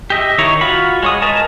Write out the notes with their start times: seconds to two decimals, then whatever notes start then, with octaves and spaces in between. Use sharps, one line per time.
0.10 G4 D#5 E5
0.38 D#3 D#4 E4 C#5
0.61 F4 F#4 B5
1.03 G#3 C#5 D#6
1.22 A#4 B4 D#5 G#5 A5